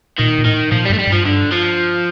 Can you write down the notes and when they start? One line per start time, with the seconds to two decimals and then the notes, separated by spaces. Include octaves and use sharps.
0.19 A#2 D#3
0.38 A#2
0.45 A2 D#3
0.72 A#2 F3
0.85 G3
0.90 G2
0.93 A3
0.99 G3
1.07 G2 F3
1.25 D3
1.52 F3